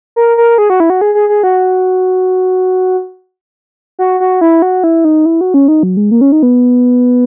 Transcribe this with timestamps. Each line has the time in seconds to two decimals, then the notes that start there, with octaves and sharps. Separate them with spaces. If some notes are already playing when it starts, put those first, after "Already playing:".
0.16 A#4
0.37 A#4
0.58 G#4
0.70 F#4
0.80 E4
0.90 F#4
1.01 G#4
1.15 G#4
1.29 G#4
1.43 F#4
3.99 F#4
4.20 F#4
4.41 E4
4.62 F#4
4.84 E4
5.05 D#4
5.26 E4
5.41 F#4
5.54 C#4
5.68 D#4
5.83 F#3
5.97 G#3
6.11 A#3
6.21 C#4
6.32 D#4
6.43 B3